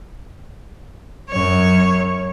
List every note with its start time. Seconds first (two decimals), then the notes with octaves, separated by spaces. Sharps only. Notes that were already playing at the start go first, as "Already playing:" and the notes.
1.30 F#2 C#5